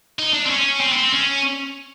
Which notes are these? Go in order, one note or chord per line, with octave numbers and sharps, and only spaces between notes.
D#4
D4
C4
C#4
C4
B3
C4
C#4